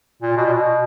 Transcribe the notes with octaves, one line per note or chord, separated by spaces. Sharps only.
A#2
B2
A#2
B2